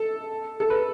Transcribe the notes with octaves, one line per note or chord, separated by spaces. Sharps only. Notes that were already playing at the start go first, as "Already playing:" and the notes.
Already playing: A4
A4
B4